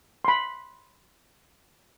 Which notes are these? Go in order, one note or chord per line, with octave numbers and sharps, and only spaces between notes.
B5 C6